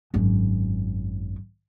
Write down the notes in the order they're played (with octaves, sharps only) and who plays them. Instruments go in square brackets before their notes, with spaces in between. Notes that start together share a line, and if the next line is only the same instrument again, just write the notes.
[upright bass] G#1 F#2